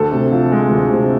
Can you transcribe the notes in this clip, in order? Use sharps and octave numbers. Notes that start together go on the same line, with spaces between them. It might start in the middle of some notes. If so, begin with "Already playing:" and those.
Already playing: D2 A4
C3
F3
G#3
D2
C3